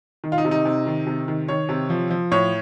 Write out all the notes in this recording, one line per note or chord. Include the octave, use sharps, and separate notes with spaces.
D#3
F4
D#4
C3
D#4
C3
D#3
C3
D#3
D#3 C#5
C3
F3
F3
A2 C#5